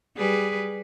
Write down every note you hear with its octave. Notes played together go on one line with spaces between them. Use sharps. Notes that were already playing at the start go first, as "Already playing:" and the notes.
G3 G#4 B4